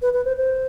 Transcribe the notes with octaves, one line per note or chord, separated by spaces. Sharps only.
B4
B4
C5
C5